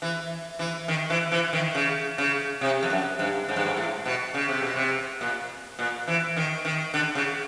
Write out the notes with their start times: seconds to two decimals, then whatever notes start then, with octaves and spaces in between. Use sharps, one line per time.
0.02 E3
0.59 E3
0.88 D#3
1.10 E3
1.32 E3
1.53 D#3
1.75 C#3
2.18 C#3
2.61 C3
2.83 F2
2.90 F#2
3.19 G2
3.49 G#2
3.56 G2
3.65 G#2
3.77 A2
4.06 B2
4.34 C#3
4.48 C3
4.62 B2
4.76 C3
5.21 A#2
5.79 A#2
6.08 E3
6.37 D#3
6.65 D#3
6.94 D3
7.15 C#3